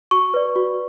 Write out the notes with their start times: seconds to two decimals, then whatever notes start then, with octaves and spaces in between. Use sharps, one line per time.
0.11 F#4 C#6
0.34 B4 D5
0.56 F#4